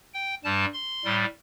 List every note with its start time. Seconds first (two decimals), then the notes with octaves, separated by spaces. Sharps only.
0.14 G5
0.44 G2 G3 A5
0.74 C6
1.04 A2 G3